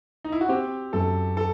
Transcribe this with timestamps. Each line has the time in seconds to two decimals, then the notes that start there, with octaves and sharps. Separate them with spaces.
0.24 D#4
0.32 E4
0.41 F#4
0.49 C4 G4
0.93 F#2 A4
1.37 A4